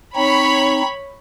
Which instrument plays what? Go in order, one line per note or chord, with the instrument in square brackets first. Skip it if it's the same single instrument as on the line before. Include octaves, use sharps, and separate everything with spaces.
[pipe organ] C4 D#4 [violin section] C#5 B5